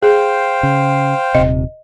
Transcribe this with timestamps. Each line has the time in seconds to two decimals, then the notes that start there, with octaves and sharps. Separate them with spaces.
0.03 G#4 C5 F5 G5
0.63 C#3
1.35 D#1 C3 D#5